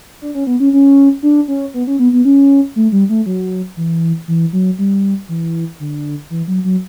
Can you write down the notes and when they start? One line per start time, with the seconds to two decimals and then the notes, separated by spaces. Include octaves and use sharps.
0.22 D4
0.35 C#4
0.47 B3
0.60 C#4
0.73 C#4
1.23 D4
1.48 C#4
1.74 B3
1.87 C#4
1.99 B3
2.13 B3
2.25 C#4
2.76 A3
2.92 G3
3.09 A3
3.26 F#3
3.77 E3
4.28 E3
4.53 F#3
4.79 G3
5.29 E3
5.80 D3
6.30 E3
6.48 F#3
6.64 F#3